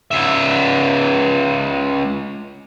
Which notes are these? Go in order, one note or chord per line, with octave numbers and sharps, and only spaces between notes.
C#2 E5